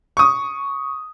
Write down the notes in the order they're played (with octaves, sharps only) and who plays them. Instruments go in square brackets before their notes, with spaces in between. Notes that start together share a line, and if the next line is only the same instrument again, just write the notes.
[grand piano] C#6 D#6